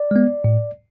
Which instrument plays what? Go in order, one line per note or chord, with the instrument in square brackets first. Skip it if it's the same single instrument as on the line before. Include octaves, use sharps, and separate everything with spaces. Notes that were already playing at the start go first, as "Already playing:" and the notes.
Already playing: [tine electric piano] D5
G#3 B3
A2